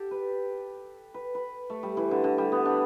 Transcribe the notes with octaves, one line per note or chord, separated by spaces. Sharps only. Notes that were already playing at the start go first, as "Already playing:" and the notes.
Already playing: G4 A4
B4
B4
B4
A3
G3
E3
D3
D3
G3
B3
D4